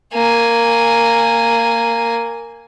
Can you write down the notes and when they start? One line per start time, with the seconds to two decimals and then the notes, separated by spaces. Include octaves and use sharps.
0.13 A#3 G#5